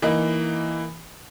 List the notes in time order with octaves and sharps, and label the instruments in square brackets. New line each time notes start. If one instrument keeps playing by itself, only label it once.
[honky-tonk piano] E3 A#3 D#4